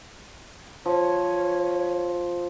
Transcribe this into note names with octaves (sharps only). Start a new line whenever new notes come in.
F3 C#5